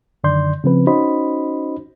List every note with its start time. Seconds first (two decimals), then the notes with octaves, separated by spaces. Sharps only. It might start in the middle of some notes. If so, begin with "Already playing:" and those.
0.24 F#2 D3 D#3 D5 C6 G6
0.64 C#3 F3 C4 B4
0.87 C#4 D#4 F#4 C5 D#5 B5